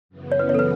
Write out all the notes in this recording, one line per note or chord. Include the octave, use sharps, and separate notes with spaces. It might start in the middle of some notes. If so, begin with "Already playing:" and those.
F#2 C#3 E3 B3
C#5
B4
C#5
A4
B4